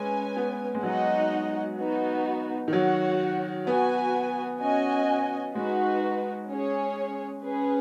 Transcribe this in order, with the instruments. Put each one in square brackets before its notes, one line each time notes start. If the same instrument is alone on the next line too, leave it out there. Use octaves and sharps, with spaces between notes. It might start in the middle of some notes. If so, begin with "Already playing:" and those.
Already playing: [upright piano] G#3 [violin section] C#4 B4 G#5
[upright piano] B3
G#3
[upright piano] F#3 [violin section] D#4 F#4 D#5 F#5
[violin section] B3 D#4 F#4
[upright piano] D#3
[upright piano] F#3 [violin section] F#4 C#5 F#5
[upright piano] B3 [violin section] F#4 B4 G#5
[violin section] C#4 F#4 D#5 G#5
[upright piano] G#3 [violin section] D#4 F#4 B4
[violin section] C#4 G#4 C#5
C#4 G#4 B4